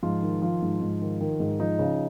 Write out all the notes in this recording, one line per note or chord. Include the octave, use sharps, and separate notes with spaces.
G#2 F3 F4
D#3
D#3 F3 F4
G#2
G#2
D#3
D#3
G#2
F3 D#4
C#3